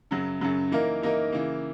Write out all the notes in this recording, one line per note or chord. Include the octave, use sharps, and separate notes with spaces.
F#2 C#3 F#3
F#2 C#3 F#3
E3 A#3 D#4 A#4
E3 A#3 D#4 A#4
C#3 E3 A#3